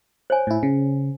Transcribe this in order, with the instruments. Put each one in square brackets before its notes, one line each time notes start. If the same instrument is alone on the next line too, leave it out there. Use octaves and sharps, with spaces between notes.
[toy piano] C5 C#5 G#5
[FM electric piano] A2 E4
C#3